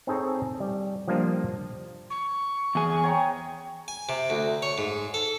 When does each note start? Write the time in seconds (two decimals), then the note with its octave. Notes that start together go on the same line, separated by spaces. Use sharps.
0.07 C4 D#4 G#4 A4 C#5
0.60 G3
1.08 F3 G3 A#3 D4 C5 D#5
2.10 C#6
2.75 E2 G#4
3.04 C#5 G5 A#5
3.88 G#5
4.09 C3
4.30 D2
4.62 C#5
4.78 G#2
5.14 A4